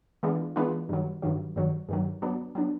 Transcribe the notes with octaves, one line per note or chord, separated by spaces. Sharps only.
E3 G#3 B3 D4 F4
E3 G#3 B3 D4 F4
G2 D#3 F#3
G2 D#3 F#3
G2 D#3 F#3
G2 D#3 F#3
F#3 B3 D4
F#3 B3 D4